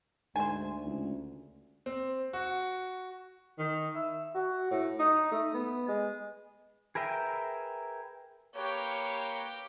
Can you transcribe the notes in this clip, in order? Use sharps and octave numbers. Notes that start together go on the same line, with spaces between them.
D2 G#2 C5 G#5
C#2
C4
F#4
D#3
E5
F#4
A2
D#4
A3
B3
G#3
G#4 A#4 B4 E5 G5
A#3 G4 B4 C#5 G5